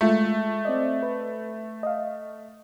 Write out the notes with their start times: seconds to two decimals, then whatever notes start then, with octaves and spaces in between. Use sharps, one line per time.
0.01 G#3 A3 F4
0.65 C4 D5 D#5
1.02 B4
1.83 D#5 F5